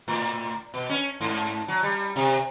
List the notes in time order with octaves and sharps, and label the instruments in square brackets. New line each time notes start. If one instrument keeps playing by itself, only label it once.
[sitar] A2
B2
C#4
G#2
F#3
G3
C3